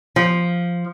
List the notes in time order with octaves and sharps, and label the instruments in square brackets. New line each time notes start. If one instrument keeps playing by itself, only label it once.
[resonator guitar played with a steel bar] F3